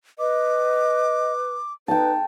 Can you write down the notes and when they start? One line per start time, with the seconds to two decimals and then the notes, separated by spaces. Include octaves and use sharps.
0.19 B4 D#5 D6
1.88 D#4 B4 G5 A5